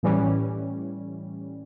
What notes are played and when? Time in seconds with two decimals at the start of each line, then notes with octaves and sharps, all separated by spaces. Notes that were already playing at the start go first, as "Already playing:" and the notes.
0.03 A2 E3 G3 C#4